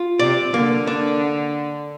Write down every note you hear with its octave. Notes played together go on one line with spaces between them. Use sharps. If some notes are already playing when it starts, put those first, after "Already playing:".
Already playing: F4
C3 D5
D3 A#3
D4